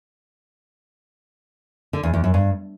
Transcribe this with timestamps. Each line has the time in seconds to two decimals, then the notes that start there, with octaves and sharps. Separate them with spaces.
1.93 D3
2.03 E2
2.14 E2
2.24 F#2
2.34 G2